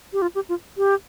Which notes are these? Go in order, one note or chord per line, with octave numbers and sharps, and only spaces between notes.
G4
F4
G4
F4
G4